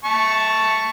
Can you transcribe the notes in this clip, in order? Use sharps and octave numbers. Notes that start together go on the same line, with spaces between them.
A5 C#6